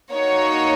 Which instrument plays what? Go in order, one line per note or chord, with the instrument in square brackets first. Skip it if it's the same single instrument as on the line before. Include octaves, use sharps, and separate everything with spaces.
[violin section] A#3 D#4 F#4 C#5